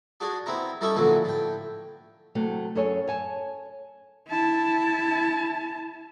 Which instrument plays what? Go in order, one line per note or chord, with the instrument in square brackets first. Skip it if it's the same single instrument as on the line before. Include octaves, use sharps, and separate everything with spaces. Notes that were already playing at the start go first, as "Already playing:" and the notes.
[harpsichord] D4 F#4 G#4
B3 C4 E4 A#5
G3 C#4 D#4 E4 A4 C#6
A#1 D3 E3 F#3 F#4
A2 G5
[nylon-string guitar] C3 F#3 A3
F#2 G#4 A4 C#5 G#5
C#5 G#5 A5
[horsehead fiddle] E4 A5